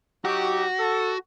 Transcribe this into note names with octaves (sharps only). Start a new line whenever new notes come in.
F#3 D#4 F#4 G4
A4